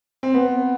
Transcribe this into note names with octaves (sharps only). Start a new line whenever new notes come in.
C4
B3